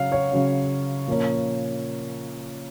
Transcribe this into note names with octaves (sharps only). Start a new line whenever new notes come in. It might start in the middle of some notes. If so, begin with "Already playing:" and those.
Already playing: C#3 F#3 C#4 F5
C#5
C#3 F#3 C#4
A#2 F3 A#3 C#4